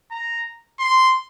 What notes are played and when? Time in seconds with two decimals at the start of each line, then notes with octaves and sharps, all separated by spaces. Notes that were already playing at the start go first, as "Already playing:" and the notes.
0.11 A#5
0.79 C6